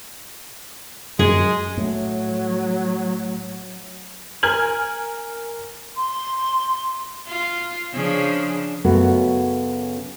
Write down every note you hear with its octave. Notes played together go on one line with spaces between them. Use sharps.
F#2 G#3 G#4
A2 F#3
A#4 G#5 F6 G#6 F#7
C6
F4
C#3 F3 D4
F#2 C#3 A3 B3 C#4 F#4